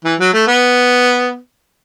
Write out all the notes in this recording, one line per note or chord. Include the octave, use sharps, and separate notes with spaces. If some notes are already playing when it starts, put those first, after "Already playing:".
E3
F#3
A3
B3